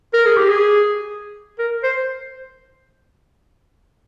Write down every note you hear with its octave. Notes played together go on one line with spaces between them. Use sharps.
A#4
G#4
G4
G#4
A#4
C5